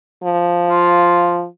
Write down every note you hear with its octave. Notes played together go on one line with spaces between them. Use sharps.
F3
F4